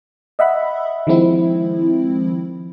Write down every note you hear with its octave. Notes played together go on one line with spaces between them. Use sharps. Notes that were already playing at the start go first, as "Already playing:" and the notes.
D#5 E5 F#5 B5
D#3 F3 G#3 C4 E4